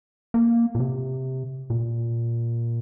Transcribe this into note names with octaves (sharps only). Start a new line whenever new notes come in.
A#3
A#2
C3
A#2